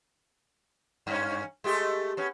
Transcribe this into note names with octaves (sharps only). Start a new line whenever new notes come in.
G2 C#4
G#3 A3 G4
B3 C#4